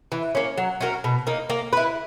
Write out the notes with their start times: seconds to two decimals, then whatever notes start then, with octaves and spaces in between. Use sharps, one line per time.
0.12 E3
0.35 A#3 C#4
0.58 F#3
0.81 C#4 F#4 A#4
1.04 B2
1.27 A#3 D#4
1.50 A#3
1.73 E4 B4